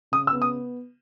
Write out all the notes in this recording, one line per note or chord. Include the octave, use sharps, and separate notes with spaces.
C#3 D#6
E6
B3
D#6